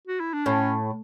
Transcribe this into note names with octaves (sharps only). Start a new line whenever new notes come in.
F#4
E4
D4
A2 C#4